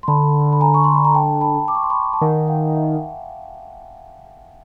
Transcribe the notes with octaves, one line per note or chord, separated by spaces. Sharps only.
C6
D3 A5 B5
B5
G#5 A#5
C#6
C6
B5
A#5
G5 A5
A5 B5
D6
C#6
C6
B5 C#6
A5
D#3 F#5 G#5
F5 G5
E5 F#5